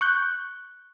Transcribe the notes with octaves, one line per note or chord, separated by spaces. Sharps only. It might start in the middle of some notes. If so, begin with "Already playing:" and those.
C#6 F#6 G6